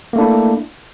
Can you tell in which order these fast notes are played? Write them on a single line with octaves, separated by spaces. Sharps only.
A#3 A3 D4 E4